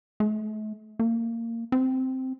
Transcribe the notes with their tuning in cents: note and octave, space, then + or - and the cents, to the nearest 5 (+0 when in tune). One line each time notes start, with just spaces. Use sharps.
A3 -40
A#3 -20
C4 -5